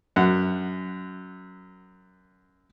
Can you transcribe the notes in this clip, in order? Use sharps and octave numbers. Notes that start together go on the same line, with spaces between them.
F#2 F#5